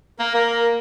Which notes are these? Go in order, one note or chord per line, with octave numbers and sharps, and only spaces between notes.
A#3 A#4
A#3